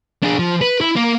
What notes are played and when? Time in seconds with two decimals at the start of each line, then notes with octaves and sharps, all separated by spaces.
0.23 D4 G#4
0.39 F3
0.61 B4
0.81 E4
0.96 A#3